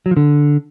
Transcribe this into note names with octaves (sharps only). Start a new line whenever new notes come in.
F#3
F3
D3